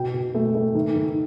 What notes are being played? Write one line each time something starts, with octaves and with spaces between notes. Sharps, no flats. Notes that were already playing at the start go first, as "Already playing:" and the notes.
Already playing: B2 G5
B2
A3
A3
D#3
D#3